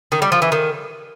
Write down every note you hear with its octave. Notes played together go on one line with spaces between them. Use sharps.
D#3
G3
F3
E3
D#3